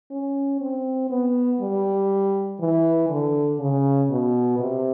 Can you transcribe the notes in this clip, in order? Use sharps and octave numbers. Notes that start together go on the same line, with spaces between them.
C#4
C4
B3
G3
E3
D3
C#3
B2
C3